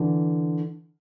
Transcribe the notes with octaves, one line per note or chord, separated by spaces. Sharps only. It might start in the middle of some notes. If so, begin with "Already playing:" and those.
Already playing: D3 E3